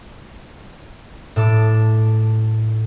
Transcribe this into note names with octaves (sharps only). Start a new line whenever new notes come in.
A2 A4 D6